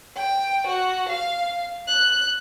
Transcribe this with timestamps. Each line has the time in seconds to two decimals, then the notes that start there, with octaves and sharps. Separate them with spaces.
0.17 G5
0.67 F#4
1.09 F5
1.88 F#6